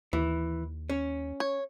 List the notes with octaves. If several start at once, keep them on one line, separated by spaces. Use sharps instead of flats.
D#2 E3
C#4
C#5